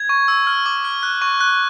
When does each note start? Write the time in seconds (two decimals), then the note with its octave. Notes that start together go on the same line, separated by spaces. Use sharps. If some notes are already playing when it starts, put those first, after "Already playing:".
Already playing: G#6
0.09 C#6
0.28 E6
0.47 F6
0.66 D6
0.85 F6
1.03 F#6
1.22 C#6
1.41 F#6